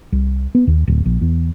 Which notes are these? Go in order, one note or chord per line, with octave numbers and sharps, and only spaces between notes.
C2
B3
D#2
D1
A#1
E2